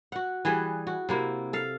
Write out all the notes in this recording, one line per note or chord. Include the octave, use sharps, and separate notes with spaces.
F#4 F#5
E3 G3 G#4 B4
F#4
C3 A#3 E4
A4 F5